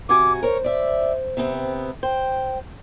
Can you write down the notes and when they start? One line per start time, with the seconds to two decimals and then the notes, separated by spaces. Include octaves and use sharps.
0.09 C3 F#4 G#5 D6
0.43 A#4 C5 C#5
0.64 D5 E5
1.37 C3 B3 C4
2.03 C5 G5